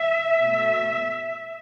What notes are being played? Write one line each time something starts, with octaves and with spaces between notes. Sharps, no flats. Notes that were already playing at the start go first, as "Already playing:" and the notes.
Already playing: E5
B2 A3